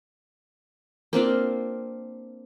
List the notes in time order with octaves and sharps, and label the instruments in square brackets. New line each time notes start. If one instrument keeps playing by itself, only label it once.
[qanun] A#3 C4 D4 F4